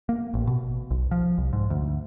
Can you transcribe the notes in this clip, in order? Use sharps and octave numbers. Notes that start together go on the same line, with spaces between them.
A#3
A1
B2
B1
F3
C2
G#2
D2